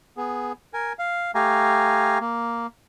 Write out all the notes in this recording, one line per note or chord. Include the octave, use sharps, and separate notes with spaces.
B3 G#4
A#4 G#5
F5
A3 G4 F5 G#5 A#5
A#3